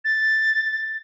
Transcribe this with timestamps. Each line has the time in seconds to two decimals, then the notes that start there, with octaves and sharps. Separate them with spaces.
0.05 A6